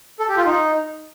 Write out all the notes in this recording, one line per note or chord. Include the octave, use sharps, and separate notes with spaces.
A4
G4
F4
D#4